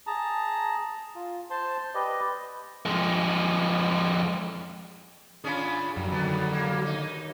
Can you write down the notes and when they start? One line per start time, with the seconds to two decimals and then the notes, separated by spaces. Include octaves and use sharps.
0.07 G#4 A5 A#5
1.15 F4
1.50 C5 A5 C6
1.95 G4 B4 D5 D#5
2.86 F2 G#3
5.44 C#4 D4 F4 G#4 B5
5.97 F#2 F#3 G3
6.12 D#2 D3 B3
6.53 A#3
6.83 D#2 D#4